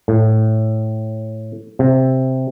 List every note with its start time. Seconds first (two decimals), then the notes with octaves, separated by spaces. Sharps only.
0.08 A2
1.79 C3